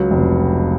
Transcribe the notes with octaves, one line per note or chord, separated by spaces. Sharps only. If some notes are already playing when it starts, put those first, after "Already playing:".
Already playing: C#2 F#3
F1